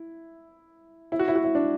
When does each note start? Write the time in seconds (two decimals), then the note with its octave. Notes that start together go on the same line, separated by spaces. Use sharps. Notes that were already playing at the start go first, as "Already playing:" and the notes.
Already playing: E4
1.12 E4
1.19 F#4
1.28 E4
1.36 F#4
1.44 E4
1.55 D4